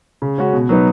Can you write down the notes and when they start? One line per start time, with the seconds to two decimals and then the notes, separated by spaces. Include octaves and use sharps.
0.22 C#3
0.38 G#3 C#4 F#4
0.53 B2
0.69 F#3 B3 D#4 B4